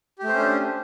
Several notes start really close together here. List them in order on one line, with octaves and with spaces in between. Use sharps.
G4 A3 C5 C#4 D4